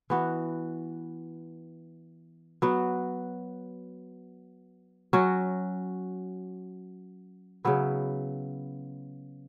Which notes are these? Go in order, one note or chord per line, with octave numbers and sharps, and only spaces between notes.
E3 B3 F#4
F#3 B3 F#4
F#3 C#4 F#4
C#3 F#3 B3 E4